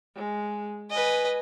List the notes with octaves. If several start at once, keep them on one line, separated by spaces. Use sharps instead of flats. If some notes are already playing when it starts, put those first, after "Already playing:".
G#3
B4 D#5 G#5